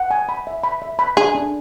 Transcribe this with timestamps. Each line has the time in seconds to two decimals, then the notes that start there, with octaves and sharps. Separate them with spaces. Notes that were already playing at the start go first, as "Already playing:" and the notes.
Already playing: F#5
0.11 G#5
0.29 B5
0.47 E5
0.63 B5
0.82 E5
0.99 B5
1.17 D4 G#4
1.35 D4